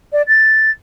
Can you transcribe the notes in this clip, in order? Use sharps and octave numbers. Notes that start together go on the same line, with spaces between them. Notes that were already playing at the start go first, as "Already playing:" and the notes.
D5
A6